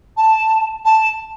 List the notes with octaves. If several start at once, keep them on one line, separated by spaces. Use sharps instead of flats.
A5
A5